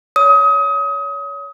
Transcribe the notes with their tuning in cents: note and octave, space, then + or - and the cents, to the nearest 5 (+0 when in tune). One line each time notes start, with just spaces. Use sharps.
C#5 +25 D#6 +30